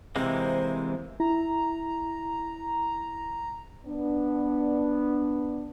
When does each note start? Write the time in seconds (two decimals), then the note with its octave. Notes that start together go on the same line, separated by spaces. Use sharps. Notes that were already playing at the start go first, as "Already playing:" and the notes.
0.16 C3 E3 G#3 A#3 C5
1.20 E4 A#5
3.86 B3 D4